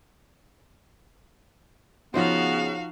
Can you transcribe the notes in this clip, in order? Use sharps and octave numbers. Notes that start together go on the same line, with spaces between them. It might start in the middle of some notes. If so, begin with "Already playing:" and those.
C#3 F3 B3 D#4 F#4 C5 F5